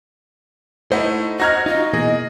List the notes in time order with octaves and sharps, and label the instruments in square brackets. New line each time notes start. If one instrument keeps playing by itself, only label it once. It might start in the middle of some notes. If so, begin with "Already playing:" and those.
[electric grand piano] A3 D#4 E4 [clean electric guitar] C5 F#5 [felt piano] D#5
[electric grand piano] F#4 A#5 [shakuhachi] D#5 [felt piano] F6 G#6 A#6
[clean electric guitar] D#4 F4 [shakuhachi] D#5
[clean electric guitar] B2 E3 A#3 [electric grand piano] G#4